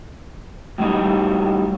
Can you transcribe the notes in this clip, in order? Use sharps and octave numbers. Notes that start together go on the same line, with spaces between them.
A2 F#3 G3 D#4